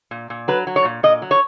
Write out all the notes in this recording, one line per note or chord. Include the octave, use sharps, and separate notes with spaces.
A#2
A#2
F#3 B4
F#3
C#5
A#2
A#2 D#5
F#3
C#5